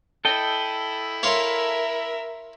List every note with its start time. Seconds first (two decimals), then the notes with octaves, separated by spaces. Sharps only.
0.25 E4 A4 D#5 G5
1.23 A#4 C#5 E5 F5 C6